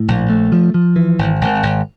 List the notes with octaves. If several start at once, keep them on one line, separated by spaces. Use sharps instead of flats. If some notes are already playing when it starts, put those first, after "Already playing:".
Already playing: A2
A#1
A3
F3
F3
E3
G#1
G#1
G#1